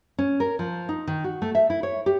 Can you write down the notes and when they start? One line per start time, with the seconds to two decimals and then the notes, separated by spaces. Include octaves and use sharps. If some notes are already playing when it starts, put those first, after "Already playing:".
0.18 C#4
0.40 A#4
0.59 F3
0.89 D#4
1.07 D#3
1.24 F#4
1.42 A3
1.55 E5
1.70 E4
1.83 C#5
2.06 G4